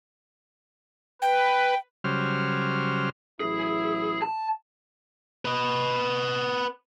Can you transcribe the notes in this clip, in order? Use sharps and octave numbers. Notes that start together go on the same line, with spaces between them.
B4 G5
C#3 F#3 G3 C5 F6
A1 F#3 E4 G#4
A5
B4 D#5